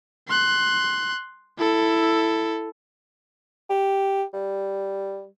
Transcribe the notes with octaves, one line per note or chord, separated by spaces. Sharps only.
C6 F#6
E4 A4
G4
G3